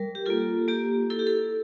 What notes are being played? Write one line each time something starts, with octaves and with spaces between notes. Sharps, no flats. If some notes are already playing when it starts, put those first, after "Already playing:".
Already playing: G3 A#4
G4
A#3 F4 A4
A#3 G4
E4 A4
G4
A4